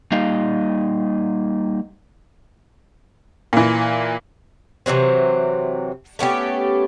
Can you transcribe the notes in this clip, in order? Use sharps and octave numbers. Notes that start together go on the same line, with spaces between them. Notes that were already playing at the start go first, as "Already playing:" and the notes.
G3 A#3 D#4 D#5 F5
A#2 E3
C3 E3 F#3 C4
A3 B3 C#4 G4